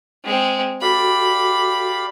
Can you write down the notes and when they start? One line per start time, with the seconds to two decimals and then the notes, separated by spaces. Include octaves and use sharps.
0.24 G#3 C4
0.82 F#4 G4 A4 D5 F5 B5 D6